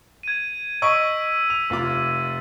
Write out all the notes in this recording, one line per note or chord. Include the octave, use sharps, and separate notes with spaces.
G#6 D#7
D#5 C#6 E6 B6 D7 D#7
F7
F1 F4 D6